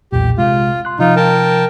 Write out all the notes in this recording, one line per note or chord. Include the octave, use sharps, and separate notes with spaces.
B1 E2 A#2 G4
C3 G#3 F4
C6 F#6
C3 F3 D#4 F4
A#4 G5 A5